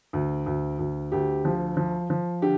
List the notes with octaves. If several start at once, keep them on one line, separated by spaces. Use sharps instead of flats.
D2
D2
D2
D2 G4
F3
F3
F3
D3 G4